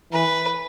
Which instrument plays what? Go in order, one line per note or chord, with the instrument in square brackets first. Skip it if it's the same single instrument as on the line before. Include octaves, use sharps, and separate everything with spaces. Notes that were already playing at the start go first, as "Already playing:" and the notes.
[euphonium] E3 [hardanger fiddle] B4